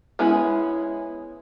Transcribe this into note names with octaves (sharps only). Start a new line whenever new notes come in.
G#3 B3 C#4 E4 G#4